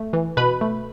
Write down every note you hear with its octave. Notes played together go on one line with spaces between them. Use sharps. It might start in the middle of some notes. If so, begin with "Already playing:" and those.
Already playing: A3
E3
B2 B4 B5
A3